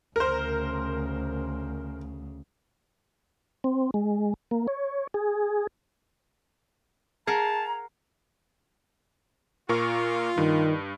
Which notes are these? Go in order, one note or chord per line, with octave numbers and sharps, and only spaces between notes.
D2 C#3 A#4 C5
C4
G#3
A#3
C#5
G#4
G#4 A#4 F5 F#5 A5 A#5
A#2 F4 A#4 C#6
G2 D#3